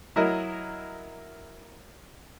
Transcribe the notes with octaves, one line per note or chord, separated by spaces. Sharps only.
F#3 E4 A#4 D#5